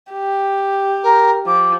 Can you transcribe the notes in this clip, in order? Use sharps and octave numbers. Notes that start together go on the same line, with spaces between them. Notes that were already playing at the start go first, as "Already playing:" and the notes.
G4
A#4
F3 D6